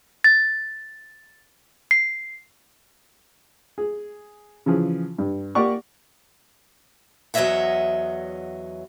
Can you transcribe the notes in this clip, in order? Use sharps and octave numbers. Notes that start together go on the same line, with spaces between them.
A6
C7
G#4
C#3 E3 F3 G#4
G2
A#3 G4 D5 F#5 C#6
E2 F#3 C#5 D#5 E5 F#5